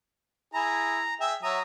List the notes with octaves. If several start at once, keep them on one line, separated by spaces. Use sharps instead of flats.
E4 G#4 A#5
G#4 E5 G5
F#3 E5 A#5 D#6